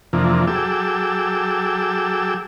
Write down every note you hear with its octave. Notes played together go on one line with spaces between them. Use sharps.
F2 C3 E3 F3 A#3 D4
F#3 G#4 A4 G5 D6 E6